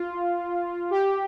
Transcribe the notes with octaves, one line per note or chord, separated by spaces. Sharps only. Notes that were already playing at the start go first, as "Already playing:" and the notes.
Already playing: F4
G4